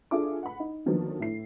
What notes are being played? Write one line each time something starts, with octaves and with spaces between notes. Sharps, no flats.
D4 F4 G#4 A4 E5 D6
F#5 B5
D#4
D3 D#3 F3 F#3 A#3 B3
A2 E4 C7